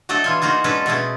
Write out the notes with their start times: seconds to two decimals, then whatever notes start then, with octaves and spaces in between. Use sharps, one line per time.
0.09 F#3 A3 D4 A4 D#5
0.24 E3 F4 G#5
0.42 A#3 D#4 F4 F#4 G#4
0.64 G#3 C#4 D4 A4 B4
0.86 B2 A3 C#4 G#4